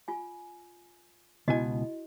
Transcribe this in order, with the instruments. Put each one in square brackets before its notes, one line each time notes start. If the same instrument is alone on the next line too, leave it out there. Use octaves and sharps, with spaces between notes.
[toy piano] F4 G#5
[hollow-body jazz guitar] C#2 B2 G#5 [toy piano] E4 F#4 D#5